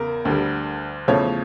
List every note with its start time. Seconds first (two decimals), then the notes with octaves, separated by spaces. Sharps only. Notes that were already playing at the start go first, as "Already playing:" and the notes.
Already playing: E2 C#3 A#4
0.25 D2 D3 G3
1.08 E2 C#3 F3 A3 C#5